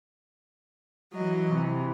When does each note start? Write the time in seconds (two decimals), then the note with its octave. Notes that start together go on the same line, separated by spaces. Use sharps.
1.13 E3 F#3 D#5
1.53 C3 E3